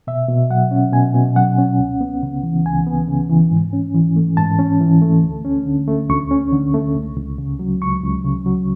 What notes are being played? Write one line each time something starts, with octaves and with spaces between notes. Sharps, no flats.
B2 E5
B2
F#3 F#5
C#4
B2 G#5
B2
F#3 F#5
C#4
C#2
B3
C#3
E3
C#2 G#5
B3
C#3
E3
G#2
C#4
E3
A3
G#2 A5
C#4
E3
A3
D2
C#4
D3
A3
D2 C#6
C#4
D3
A3
C#2
C#2
C#3
F#3
C#2 C#6
C#2
C#3
F#3